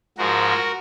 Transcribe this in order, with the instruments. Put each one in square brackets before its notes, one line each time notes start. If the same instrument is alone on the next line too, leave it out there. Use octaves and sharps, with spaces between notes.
[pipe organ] G#2 F3 G#3 F#4 A#4